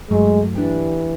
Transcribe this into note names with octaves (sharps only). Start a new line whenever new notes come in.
G2 F#3 G#3 A3
E3 D4 G4